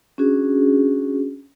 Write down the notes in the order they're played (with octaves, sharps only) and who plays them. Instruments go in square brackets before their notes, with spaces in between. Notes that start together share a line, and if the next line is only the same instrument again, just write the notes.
[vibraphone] C#4 D4 F#4 G#4